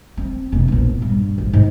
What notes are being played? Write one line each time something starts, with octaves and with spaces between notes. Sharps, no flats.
C4
E1 A#3
A#1 B3
G2
A1
G#2